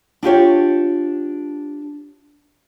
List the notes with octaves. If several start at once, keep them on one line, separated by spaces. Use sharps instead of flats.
D4 F4 G4 C#5